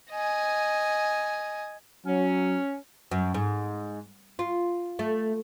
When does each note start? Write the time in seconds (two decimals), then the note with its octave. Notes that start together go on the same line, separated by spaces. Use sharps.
0.11 D#5 G#5
2.05 F#3 C#4
3.11 F#2
3.34 G#2
4.39 F4
4.99 A3